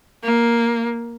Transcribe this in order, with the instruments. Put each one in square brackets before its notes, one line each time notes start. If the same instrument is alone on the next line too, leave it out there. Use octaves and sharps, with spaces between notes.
[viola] A#3